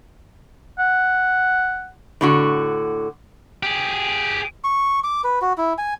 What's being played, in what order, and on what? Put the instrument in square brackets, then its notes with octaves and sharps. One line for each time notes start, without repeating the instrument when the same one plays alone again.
[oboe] F#5
[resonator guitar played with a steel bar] A2 D3 F#4
[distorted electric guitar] G4 G#4
[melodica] C#6
D6
B4
F#4
E4
G#5